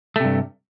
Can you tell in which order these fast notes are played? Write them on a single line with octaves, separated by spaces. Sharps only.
A3 C3 G2